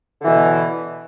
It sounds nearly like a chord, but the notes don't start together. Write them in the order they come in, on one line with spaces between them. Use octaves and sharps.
D3 E3 B2